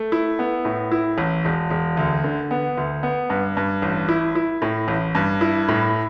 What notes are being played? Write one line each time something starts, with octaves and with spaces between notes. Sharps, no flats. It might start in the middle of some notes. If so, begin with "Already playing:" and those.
Already playing: A3
E4
B3
A2
E4
A1
E1
E1
D2
D3
B3
D2
B3
G2
G2
A1
E4
E4
A2
A1
G2
E4
A2